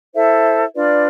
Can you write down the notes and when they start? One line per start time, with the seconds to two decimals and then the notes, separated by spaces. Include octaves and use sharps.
0.13 E4 A4 C5 E5
0.75 D4 F4 B4 D5